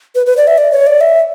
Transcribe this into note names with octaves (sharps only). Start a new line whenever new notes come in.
B4
B4
D5
E5
D5
C#5
D5
E5